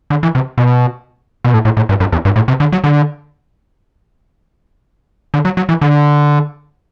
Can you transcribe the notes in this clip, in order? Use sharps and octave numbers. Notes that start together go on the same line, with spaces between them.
D3
E3
C3
B2
B2
A2
A2
A2
G2
F#2
E2
G2
A2
C3
D3
F#3
D3
D3
F#3
F#3
E3
D3